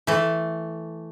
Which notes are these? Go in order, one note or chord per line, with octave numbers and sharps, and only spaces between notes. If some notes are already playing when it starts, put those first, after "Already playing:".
E3 A3